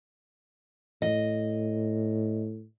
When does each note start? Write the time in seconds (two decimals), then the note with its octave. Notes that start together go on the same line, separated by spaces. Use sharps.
1.02 A2 D#5